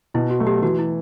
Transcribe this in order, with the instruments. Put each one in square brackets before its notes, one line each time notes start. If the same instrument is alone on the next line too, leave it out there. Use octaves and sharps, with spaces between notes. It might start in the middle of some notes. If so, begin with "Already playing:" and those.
[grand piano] B2 [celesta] E4
[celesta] F#4
[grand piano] F#3 A3
[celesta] G4
[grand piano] E3 [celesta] F#4
[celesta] E4